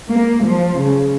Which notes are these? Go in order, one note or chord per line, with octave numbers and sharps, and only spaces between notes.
A#3
F3
C#3